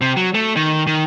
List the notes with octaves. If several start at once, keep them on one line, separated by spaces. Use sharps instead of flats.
C3
F#3
A3
D#3
D#3